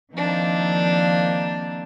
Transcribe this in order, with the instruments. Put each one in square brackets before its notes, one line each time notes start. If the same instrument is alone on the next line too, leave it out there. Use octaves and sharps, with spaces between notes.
[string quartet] D#3 F3 A#3 C4 D4 D#4